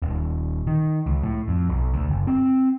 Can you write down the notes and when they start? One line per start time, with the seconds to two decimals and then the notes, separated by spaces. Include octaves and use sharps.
0.02 D#1
0.67 D#3
1.06 C#2
1.23 A2
1.48 F2
1.70 B1
1.94 D2
2.10 F#1
2.27 C4